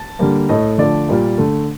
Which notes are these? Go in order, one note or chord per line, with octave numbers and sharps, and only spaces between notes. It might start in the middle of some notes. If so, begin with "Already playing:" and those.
Already playing: A5
D3 G3 A#3
A2 A3 D#5
D3 F3 A3 D5
A#2 G3 A#3
D3 A3